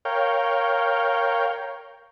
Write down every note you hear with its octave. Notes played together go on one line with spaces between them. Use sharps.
A#4 C#5 F5 G5